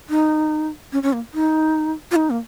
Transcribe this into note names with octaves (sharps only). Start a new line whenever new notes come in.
D#4
C#4
C#4
A#3
D#4
F4
D#4
A#3